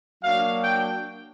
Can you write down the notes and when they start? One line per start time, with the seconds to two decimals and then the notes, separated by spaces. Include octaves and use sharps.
0.23 F#3 A#3 D4 F5
0.63 G5